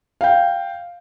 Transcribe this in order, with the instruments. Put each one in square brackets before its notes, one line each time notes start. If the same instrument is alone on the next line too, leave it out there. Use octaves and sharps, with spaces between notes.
[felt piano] F5 G5